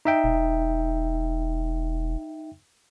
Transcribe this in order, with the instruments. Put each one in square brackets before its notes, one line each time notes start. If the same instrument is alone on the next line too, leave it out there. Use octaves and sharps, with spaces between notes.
[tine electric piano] D#4 E5 G5
[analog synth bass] E1